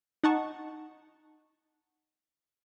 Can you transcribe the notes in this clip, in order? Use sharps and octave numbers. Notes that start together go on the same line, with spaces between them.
D#4 F#5 A5 C#6